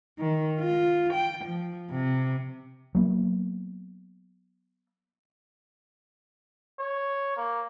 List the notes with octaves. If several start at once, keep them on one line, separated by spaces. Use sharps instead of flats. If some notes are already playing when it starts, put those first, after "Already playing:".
D#3
F4
G5
F3
C3
F#3 A#3 B3
C#5
A#3